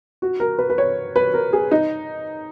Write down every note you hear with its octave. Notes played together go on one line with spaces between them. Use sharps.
F#4
A#4
B4
B4
C#5
B4
A#4
G#4
D#4